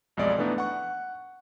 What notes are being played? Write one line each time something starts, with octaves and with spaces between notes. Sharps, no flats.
B1 F2 G#3 D5 D#5
E3 A3 B3 D4 D#4
F#5 C#6